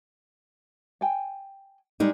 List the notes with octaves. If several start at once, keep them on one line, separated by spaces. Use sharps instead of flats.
G5 G#5
G3 G#3 D#4